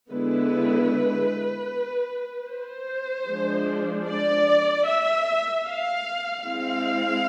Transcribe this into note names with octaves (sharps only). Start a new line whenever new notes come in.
D3 G#3 B3 E4 B4
C5
F3 G#3 D4
D5
E5
F5
G#3 C4 E4 F5